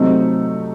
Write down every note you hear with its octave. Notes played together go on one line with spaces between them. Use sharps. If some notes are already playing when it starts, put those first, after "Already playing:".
Already playing: C3 F#3 A3 C4 D#4